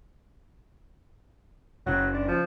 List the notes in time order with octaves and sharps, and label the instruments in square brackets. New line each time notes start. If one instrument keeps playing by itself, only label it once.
[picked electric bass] F#1 C#3 [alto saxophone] F#3
[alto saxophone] D4
F3